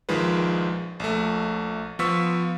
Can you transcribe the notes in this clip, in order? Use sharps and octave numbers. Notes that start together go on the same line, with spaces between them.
A#1 D#3 F3 G#3 B4
A#1 A3
F3 B3 F4 C#6 E6 B6